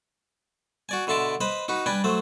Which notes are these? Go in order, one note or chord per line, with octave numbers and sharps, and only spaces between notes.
F#4 D5 G#5
B2 D3 E5 A5 C6 D6
B4 C5 D#5 B5
D#4 F#4 B4
G3 D4 B4 G5 G#5
F#3 A3 C5